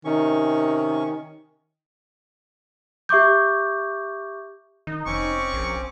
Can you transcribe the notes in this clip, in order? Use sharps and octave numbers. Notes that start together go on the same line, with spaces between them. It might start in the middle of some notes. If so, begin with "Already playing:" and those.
C3 D#3 C#4 C#6
G4 E5 C#6 D6 G6
D#3 D#4
F1 C4 C#4 C#6 D6
A#1